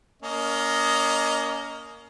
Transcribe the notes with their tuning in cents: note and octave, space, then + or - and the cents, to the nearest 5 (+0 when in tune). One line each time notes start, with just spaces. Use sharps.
A#3 +0 C#4 +30 D#5 +0